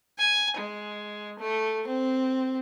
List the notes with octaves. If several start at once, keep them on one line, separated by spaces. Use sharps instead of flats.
G#5
G#3
A3
C4